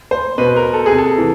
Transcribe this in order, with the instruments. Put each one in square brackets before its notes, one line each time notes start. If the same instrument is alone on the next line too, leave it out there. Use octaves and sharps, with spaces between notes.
[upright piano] C5
B2 B4
A#4
A4
G#4
C3
A4
E3